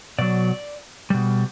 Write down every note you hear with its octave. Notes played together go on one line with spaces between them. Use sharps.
B2 F#3 D5
B2 G3